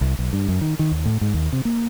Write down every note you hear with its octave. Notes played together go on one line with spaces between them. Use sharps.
C2
B1
G2
F#2
D#3
D#3
D#2
A2
G#2
D#2
C3
A#3